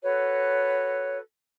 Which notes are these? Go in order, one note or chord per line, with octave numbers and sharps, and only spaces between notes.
F#4 A4 B4 C#5